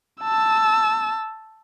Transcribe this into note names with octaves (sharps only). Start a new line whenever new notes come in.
A5 E6